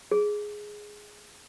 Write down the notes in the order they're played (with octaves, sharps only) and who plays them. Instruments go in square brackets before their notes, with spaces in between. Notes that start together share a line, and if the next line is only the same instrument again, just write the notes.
[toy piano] G#4